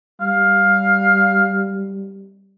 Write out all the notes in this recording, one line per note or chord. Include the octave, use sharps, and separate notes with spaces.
G3 F5